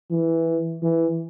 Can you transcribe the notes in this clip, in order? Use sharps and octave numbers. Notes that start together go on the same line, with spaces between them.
E3
E3